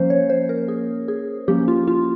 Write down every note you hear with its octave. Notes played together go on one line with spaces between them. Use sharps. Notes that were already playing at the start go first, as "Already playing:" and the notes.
Already playing: F3 A#3 C#4 C5
C#5
C5
A#4
G#4
G#4
F3 A#3 C#4 G4
F4
F4